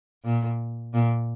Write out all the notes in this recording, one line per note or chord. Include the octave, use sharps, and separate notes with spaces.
A#2
A#2